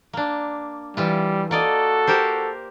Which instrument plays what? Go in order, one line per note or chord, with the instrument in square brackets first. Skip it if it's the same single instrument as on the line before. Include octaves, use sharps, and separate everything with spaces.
[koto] A#3 D4
[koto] E3 E4 F4 [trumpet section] G3
[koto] A#3 D5 D#5 [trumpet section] F#4 A4
[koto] G4 A#4 C5